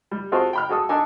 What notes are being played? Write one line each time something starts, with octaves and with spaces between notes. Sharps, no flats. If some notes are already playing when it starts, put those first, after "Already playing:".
G3
C4 F4 F#4 G#4 A4
G5 B5 F6
F#4 G#4 A4 D#6
D4 D#4 A4 G#5